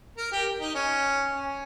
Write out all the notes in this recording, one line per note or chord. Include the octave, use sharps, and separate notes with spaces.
A#4
G4
D#4
C#4
C#4